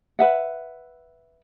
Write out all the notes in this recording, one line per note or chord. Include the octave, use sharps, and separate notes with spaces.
B4 E5 F#5